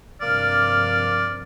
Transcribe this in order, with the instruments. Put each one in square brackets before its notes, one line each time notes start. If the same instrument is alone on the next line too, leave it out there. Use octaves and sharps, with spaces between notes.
[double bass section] G2 C3 F3 [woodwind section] A#3 D6 F6 [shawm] D5